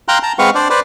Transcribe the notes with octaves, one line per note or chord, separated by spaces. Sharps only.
F5 G5 A#5 C6 F#6
A5 A#5
G#3 C4 B4 F5 F#5 C#6
D4 C5 D5
B4 C5 D5